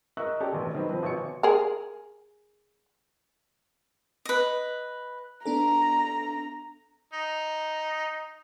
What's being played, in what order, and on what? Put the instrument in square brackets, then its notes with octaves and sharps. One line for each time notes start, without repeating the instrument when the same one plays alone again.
[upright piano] A#4 D#5 E5 C#6 E6 F#6
C#4 G4 A4 D5
E1 A1
C3 D#3 F#3 C4 B4
F3 C4 B4
G#1 B2 C#5 C#6 C#7
[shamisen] G#4 A#4
[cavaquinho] B4 D#5
[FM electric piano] B3 D4 A4 [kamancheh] A#5
[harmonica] D#4